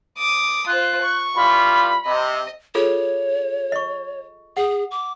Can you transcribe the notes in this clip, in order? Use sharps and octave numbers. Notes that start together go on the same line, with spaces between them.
D6 D#6
F4 C5 F#6
C#6
E3 G3 F4 B5
C3 D#5
F4 G#4 A4 C#5
D#5 C#6
G#4 F#5
D6